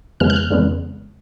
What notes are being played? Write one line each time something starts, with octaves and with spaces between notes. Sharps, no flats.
F2 C#3 E3 G#3 B3 F6
F#6
F6
F2 C#3 E3 G#3 B3